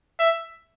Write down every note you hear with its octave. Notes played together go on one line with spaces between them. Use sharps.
E5